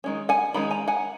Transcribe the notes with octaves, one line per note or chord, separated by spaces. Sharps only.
D#3 G#3 C#4
F#5 G#5
D#3 G#3 C#4 B5
G#5 A#5
F#5 G#5